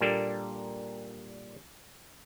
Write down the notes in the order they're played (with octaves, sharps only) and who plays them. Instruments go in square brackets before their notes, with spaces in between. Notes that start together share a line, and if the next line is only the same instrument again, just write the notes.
[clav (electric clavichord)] A#2 G3 A#3 D4 A4